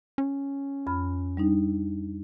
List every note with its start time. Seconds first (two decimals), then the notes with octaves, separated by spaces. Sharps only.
0.18 C#4
0.87 F2 B5 F6
1.37 G3 D4 D#4